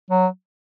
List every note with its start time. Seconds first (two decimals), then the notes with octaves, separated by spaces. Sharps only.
0.11 F#3